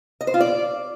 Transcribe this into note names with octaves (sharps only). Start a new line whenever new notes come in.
D#5
C5
F4
D5